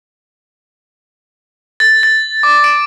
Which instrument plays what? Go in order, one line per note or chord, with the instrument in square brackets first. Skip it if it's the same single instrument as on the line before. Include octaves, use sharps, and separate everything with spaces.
[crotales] A6
A6
D6
D7